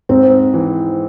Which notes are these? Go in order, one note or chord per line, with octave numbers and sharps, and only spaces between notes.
G#2 C4
E3